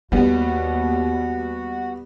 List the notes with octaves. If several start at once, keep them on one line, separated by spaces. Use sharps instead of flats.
D#2 G3 A#3 B3 F#4